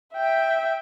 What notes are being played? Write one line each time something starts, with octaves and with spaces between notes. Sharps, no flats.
E5 G5